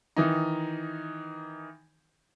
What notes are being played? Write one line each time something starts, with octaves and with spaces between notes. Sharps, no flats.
D#3 E3 D#4